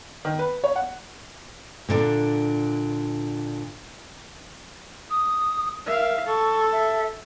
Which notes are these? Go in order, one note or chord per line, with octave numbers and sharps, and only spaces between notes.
D#3
B4
C#5
F#5
A#2 D3 D4
D#6
A#4 E5 F5
A4 C#6
E5